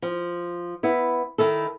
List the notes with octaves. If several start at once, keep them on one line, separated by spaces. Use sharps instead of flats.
F3
B3 E4
D#3 E4 A4